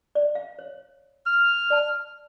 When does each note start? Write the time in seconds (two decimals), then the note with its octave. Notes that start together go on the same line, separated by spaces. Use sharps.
0.15 D5
0.35 F5
0.59 C#5
1.26 F6
1.70 D5 A5